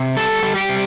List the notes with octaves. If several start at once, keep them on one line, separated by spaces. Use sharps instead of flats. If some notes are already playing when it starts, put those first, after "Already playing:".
Already playing: C3
G3 A4
G3
G4
C3